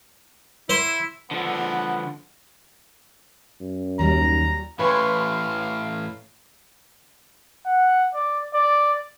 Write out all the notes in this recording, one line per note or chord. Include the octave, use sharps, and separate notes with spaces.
E4 C5
D3 F3 B3
F#2
D#2 F#3 G3 A#4 A#5
A2 E3 B4 C#5 F5 G#5 B5 C6
F#5
D5
D5